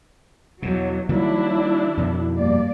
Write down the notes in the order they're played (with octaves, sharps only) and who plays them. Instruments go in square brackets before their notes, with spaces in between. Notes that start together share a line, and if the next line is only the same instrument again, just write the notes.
[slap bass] E2 B2 [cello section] F#3
[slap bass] D#3 G3 A#3 [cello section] F#3 [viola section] D4 E4
[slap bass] F2 B2 D#3
[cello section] G2 A#3 D5